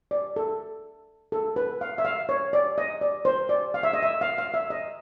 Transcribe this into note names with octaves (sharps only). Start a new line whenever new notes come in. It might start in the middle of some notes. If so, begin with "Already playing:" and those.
D5
A4
A4
B4
F5
E5
F5
C#5
D5
D#5
D5
C5
D5
F5
E5
D#5
E5
F5
F5
E5
D#5